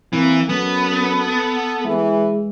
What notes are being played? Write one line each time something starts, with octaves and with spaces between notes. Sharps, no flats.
E3 A#3 C4
F#2 B3 A4
E3 G#3